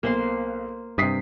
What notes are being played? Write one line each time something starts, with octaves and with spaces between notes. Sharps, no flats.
B1 A#3 C5 C6
G2 C3 D#6 B6 C7